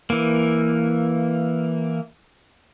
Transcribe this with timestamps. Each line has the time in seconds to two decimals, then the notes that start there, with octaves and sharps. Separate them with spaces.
0.10 E3 A#3